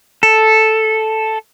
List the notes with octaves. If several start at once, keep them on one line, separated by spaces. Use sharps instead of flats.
A4